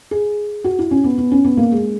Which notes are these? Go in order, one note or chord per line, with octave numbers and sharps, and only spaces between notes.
G#4
F#4
E4
C#4
B3
B3
C#4
B3
A#3
G#3